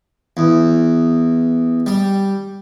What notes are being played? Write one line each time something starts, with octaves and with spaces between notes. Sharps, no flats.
E2
G3